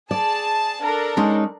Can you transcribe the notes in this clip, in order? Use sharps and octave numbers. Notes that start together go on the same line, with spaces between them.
G#4 D5 A5
D4 A4 A#4
G#3 C#4 D#4